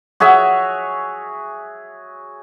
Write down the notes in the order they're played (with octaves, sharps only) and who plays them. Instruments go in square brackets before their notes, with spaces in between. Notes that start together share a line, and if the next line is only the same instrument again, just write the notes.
[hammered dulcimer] F#4 G#4 C#5 E5